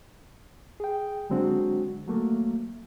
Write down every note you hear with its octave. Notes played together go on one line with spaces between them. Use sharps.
G#4 G5
D3 F#3 G#3 C4 D4 F#4
F#3 A3 A#3